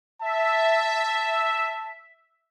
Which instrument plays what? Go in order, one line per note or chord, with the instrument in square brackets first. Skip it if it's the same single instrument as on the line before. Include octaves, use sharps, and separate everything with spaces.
[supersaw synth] E5 [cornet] A5